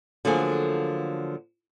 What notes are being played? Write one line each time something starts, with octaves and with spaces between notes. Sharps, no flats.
D3 F3 F#3 A3 A#3 G#4